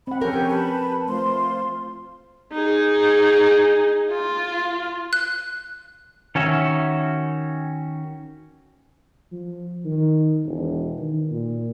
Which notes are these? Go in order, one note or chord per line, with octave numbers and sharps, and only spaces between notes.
C4 F#5 B5
F3 C#4 G4 A4 A#4 G6
B4 A5 B5
A3 F4 C5 C6
D#4 G#4
F4
F#6
D#3 C#4 F#4 E5
F3
D#3
E1
D#3
A#2